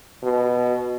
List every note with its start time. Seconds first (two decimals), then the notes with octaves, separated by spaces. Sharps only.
0.23 B2